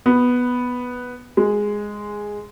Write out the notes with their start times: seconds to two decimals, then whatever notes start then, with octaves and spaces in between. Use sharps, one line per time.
0.06 B3
1.37 G#3